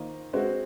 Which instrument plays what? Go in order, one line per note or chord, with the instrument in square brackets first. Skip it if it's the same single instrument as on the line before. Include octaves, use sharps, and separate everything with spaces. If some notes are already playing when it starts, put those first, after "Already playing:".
Already playing: [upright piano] D#3 A#3 F4 C5 D#5
G#3 C4 F#4 C5